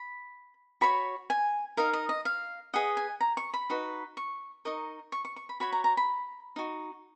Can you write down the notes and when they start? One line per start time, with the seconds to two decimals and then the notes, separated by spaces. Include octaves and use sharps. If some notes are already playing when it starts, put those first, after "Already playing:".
Already playing: B5
0.81 F#4 C#5 B5
1.30 G#5
1.77 D#4 A#4 D#5 F5
1.93 D#5
2.09 D#5
2.25 F5
2.74 G#4 B4 D#5 F#5
2.97 G#5
3.21 A#5
3.37 C#6
3.54 B5
3.70 D#4 F#4 B4
4.17 C#6
4.65 D#4 A#4 D#5 C#6
5.12 C#6
5.25 C#6
5.36 C#6
5.49 B5
5.60 F#4 C#5 B5
5.72 A#5
5.84 A#5
5.97 B5
6.56 D#4 F#4